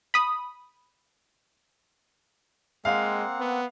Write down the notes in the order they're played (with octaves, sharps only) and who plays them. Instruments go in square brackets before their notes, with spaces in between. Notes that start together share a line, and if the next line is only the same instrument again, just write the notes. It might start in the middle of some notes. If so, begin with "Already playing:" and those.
[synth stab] B5 D#6
[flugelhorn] G#3 [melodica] A#3 C4 F#5 [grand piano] F5
[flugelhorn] B3